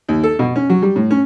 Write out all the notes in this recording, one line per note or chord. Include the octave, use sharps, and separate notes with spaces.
D#2
A4
B2
C#4
F#3
G3
A2
C#4